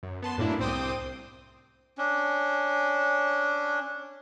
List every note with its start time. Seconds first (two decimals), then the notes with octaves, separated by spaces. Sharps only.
0.03 F#2
0.22 B3 A5 C6
0.38 F#2 A2 A#3 D4 E4
0.60 C2 C4 C5 G5 D6 D#6
1.98 C#4 D4